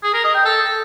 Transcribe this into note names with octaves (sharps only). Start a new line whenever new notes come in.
G#4
A#4
D#5
G5
A4